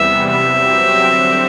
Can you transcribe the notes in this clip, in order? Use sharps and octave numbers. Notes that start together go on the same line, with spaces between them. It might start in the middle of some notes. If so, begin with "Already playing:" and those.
Already playing: E2 C3 E3 G3 B3 E5
F#3 C4 G4 E5
D3 G3 C4 F#4 C5